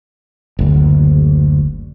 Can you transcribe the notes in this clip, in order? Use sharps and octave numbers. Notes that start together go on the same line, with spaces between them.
F#1 D2